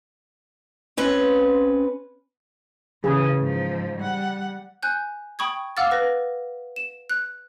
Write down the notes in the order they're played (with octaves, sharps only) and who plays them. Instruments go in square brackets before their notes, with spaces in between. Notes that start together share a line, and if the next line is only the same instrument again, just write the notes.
[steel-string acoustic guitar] C4 C#4 B4
[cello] C#3 [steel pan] E3 G#4
[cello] G#2 F3
G3 F#5
[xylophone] G#5 F#6 G6
G5 B5 C#6 D#6 G#6
F5 F#5 D6 E6 F6 A6
B4 A#6
E7
F#6